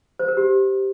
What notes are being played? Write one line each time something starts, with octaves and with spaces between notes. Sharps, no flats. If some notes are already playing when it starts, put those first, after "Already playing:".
C5
A#4
G4